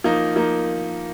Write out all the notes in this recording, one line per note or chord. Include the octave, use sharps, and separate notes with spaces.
F3 A#3 D#4
F3 A#3 D#4